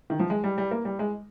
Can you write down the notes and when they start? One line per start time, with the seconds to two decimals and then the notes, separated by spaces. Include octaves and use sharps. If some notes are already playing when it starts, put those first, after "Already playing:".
0.10 D#3
0.19 F3
0.30 G#3
0.44 G3
0.58 G3
0.71 A#3
0.85 G3
0.99 G#3